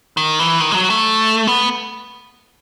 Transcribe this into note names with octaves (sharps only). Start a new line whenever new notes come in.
D#3
E3
D#3
G#3
F#3
A3
B3